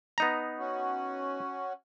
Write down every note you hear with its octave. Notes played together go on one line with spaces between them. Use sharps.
B3 D#4 A#5
C#4 F#4